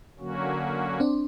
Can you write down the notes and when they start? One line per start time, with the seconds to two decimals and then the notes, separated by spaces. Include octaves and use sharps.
0.18 D3 F#3 A#3 C#4 F#4
1.00 C4 D4